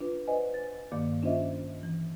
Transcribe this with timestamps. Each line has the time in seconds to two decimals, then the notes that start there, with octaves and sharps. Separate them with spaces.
0.01 D4 F4 B4
0.28 B4 C5 D5 D#5 F#5 G#5
0.54 A6
0.92 G2 D#3 A#3 D5 F5 D6
1.23 C#4 D4 F4 C5 D#5 E5
1.83 E3